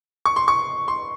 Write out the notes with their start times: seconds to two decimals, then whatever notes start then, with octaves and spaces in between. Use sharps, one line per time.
0.25 C#6
0.36 C6
0.48 C#6
0.88 C6